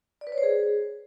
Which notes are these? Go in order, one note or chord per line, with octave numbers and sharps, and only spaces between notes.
D5
B4
C#5
C5
G#4